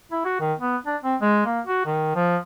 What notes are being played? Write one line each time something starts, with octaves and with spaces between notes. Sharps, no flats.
E4
F#4
D#3
B3
D4
C4
G#3
A#3
F#4
D#3
F3